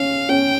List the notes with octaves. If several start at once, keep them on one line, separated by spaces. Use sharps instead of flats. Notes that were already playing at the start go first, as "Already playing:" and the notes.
Already playing: C#4 F5
C#4 G5